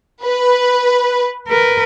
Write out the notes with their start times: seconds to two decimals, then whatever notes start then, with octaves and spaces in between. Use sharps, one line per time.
0.24 B4
1.48 A#4 B4